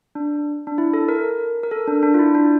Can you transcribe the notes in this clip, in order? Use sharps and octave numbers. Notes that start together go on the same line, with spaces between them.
D4
D4
E4
A4
A#4
A#4
A4
D4
D4
F4
E4
D4